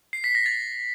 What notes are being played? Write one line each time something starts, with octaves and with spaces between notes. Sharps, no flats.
C7
B6
A#6
A6